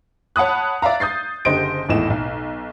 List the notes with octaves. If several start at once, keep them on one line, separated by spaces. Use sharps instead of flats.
C#5 F#5 A5 B5 D#6 F#6
D5 E5 F5 A#5
D#6 G6 A6 C7
F#1 D3 G4 C5 D#5 D7
G#1 E2 A2 D#5 E7
B1